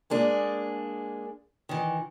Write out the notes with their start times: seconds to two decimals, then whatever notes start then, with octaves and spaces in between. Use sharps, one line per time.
0.10 G#3 A#3 D4 G#4
1.69 D#3 E3